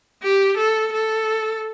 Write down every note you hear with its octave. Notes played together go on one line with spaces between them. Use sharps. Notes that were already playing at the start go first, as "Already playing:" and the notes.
G4
A4
A4